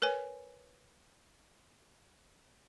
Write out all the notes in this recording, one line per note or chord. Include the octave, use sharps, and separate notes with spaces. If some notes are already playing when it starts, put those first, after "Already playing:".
A#4 B4 C#5 G#5